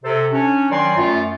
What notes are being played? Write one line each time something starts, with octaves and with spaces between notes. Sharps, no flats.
C3 A4 C5
C#4 D4
D#3 F#3 D5 G5 G#5 C6
F#2 A3 F4